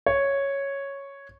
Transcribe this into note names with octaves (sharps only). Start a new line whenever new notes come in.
C#5